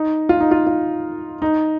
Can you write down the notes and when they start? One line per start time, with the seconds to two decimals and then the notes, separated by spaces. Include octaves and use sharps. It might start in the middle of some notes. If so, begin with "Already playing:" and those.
Already playing: D#4
0.29 F4
0.40 D#4
0.51 F4
0.67 F4
1.42 D#4